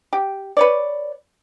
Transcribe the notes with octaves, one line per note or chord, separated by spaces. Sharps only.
G4
B4 C#5 D5